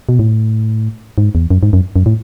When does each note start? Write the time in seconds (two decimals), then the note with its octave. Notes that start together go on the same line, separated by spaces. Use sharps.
0.09 B2
0.19 A2
1.18 G#2
1.35 E2
1.51 F#2
1.63 G#2
1.73 F#2
1.96 F#2
2.06 A2